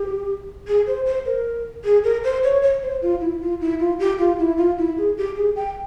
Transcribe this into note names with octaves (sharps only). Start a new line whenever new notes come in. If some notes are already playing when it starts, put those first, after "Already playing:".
Already playing: G4
G#4
C5
C5
A#4
G#4
A#4
C5
C#5
C#5
C5
F4
E4
F4
E4
F4
G4
F4
E4
F4
E4
G#4
G4
G#4
G5